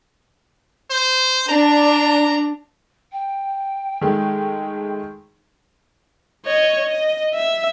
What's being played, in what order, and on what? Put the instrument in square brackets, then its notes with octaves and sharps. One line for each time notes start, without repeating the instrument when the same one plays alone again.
[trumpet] C5
[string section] D4 [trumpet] A#5
[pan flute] G5
[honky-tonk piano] D#3 G#3 A3
[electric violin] C#5 D#5
D#5
E5